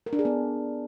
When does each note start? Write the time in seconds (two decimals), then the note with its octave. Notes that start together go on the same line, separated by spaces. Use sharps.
0.06 A#4
0.13 D4
0.19 G#4
0.25 B3